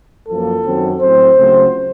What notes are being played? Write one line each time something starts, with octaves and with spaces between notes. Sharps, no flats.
F#2 F3 A#3 A4
F#2 D#3 F#3 C4
A2 F#3 C4 C5
C#2 C#3 F#3 A3 C4